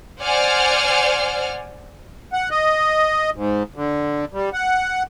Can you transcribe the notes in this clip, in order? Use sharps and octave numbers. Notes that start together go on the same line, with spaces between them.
C5 D5 F#5 G#5 F6
F#5
D#5
G#2
D3
G3
F#5